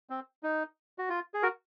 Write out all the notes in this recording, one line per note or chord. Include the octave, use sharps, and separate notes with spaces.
C4
D#4
F#4
F4
G#4
F#4 A#4